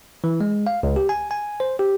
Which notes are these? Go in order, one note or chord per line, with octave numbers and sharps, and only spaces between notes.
E3
G#3
F5
C#2
G4
G#5
G#5
C5
G4